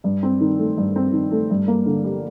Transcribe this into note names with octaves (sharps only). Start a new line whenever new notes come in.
G2
C4
D#3
A3
G2
C4
D#3
A3
G2
A#3
D3
G3